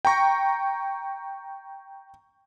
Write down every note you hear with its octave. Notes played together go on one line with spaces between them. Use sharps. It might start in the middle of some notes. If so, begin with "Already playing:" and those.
G5 A#5 C#6 A#6